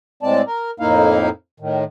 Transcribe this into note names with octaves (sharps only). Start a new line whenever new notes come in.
A2 G#3 C4 D5 A5
A#4
F2 A2 A#3 D#4 E4 F5
A2 D#3